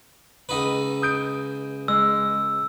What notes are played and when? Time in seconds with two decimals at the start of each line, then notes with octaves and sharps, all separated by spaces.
0.49 C#2 D#4 B4
1.02 D#6 G6 D7
1.88 G#3 E6